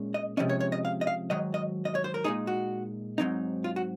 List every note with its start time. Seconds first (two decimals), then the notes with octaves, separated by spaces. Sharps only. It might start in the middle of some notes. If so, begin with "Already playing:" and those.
Already playing: A#2 G#3 C#4
0.14 D#5
0.37 C3 F3 G#3 C#4 D#5
0.49 C#5
0.61 C#5
0.72 D#5
0.85 F5
1.01 D#5
1.07 F5
1.30 G#2 D#3 F#3 D#5
1.54 D#5
1.85 D#5
1.95 C#5
2.04 C5
2.14 A#4
2.24 A#2 G#3 D#4 G#4
2.47 F#4
3.18 G#2 F#3 C4 D#4
3.64 F4
3.76 F#4